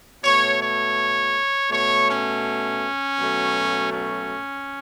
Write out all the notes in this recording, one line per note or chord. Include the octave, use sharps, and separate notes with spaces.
B2 A3 C#5
C#5
B2 A3 C#5
C#4
B2 F#3 A3
C#4